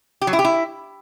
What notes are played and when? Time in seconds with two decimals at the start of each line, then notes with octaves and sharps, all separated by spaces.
0.21 G4
0.27 F#3
0.33 E4
0.39 G4
0.44 E4